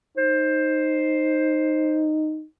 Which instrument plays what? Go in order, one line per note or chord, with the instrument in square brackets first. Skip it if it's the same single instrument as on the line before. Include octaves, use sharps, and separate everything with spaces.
[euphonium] D#4 [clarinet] C5